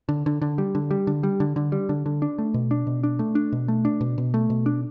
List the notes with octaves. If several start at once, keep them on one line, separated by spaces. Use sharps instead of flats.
D3
D3
D3
G3
D3
G3
D3
G3
D3
D3
G3
D3
D3
D4
A3
B2
D4
B2
D4
A3
D4
B2
A3
D4
B2
B2
A3
B2
D4